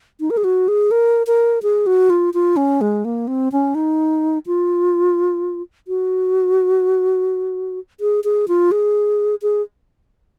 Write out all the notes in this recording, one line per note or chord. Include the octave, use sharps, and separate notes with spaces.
D#4
A#4
G#4
F#4
G#4
A#4
A#4
G#4
F#4
F4
F4
C#4
G#3
A#3
C4
C#4
D#4
F4
F#4
G#4
G#4
F4
G#4
G#4